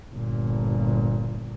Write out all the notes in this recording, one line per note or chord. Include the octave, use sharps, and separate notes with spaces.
G1 A#2